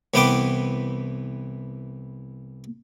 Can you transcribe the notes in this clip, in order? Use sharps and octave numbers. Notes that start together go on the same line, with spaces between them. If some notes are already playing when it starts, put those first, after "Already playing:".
C2 E3 B3 B4 G5 D6